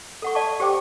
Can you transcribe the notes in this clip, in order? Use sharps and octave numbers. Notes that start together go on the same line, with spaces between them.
A4 F#5 C#6
D5 F5 A5 C#6
G4 C5 G5 D6